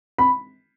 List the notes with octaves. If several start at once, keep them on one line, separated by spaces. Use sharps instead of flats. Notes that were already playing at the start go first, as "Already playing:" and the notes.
B5